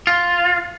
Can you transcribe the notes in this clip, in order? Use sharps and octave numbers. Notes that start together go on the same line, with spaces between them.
F4